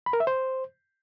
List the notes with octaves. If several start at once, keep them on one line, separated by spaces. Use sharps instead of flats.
B5
A#4
E5
C5